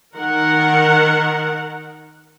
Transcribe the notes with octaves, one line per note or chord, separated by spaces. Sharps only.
D#3 A#4 F#5